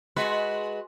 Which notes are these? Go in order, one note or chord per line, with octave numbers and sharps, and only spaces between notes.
G#3 F#4 B4